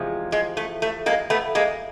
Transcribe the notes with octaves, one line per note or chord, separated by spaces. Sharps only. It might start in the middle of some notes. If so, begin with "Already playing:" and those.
Already playing: E2 C3 F3 G#3
G#3
A3
A3
G#3 A#3
A3 B3
G#3 A#3